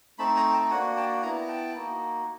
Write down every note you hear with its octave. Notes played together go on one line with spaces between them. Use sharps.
A3 C4 D#4 A5 B5
G#5 A#5
G5 A5
A#3 D4 F#4 F#5 G#5
G5 A5
B3 E4 G#5 A#5
G5 A5
A#3 D#4 F#4